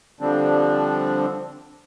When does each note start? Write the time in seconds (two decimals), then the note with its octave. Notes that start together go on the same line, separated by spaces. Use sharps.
0.21 D3 F3 G3 C4 D4